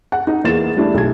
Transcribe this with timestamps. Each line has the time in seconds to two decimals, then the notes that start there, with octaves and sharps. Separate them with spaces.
0.12 F#5
0.27 D#4
0.44 E2 A#3 G#4 A6 E7
0.77 G3 A3 D4 E4
0.94 B1 G4 G#6